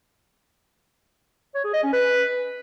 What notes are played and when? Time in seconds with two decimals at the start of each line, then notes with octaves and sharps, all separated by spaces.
1.55 C#5
1.64 G#4
1.74 D#5
1.83 C#4
1.93 B4